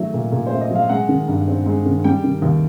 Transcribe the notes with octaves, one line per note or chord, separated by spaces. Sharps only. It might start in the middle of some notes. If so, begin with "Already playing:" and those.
Already playing: D#3 F#3 A3
A#2
A#2
C5
A3
D#5
F#3 F5
G#3 F#5
D#3
G2
C4
G#3
D#3
G3 G5
D#3
D#2